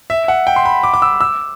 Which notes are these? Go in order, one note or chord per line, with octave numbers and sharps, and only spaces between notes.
E5
F#5
G5
C6
B5
D6
D6
E6
E6